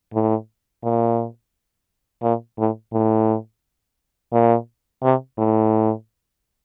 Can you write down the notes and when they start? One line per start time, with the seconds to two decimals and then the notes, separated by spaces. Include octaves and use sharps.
0.14 A2
0.84 A#2
2.23 A#2
2.58 A2
2.93 A2
4.33 A#2
5.03 C3
5.38 A2